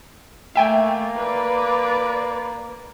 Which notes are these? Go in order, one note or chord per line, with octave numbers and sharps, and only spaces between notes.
A3 A#3 E5 G5 G#5
B4 D5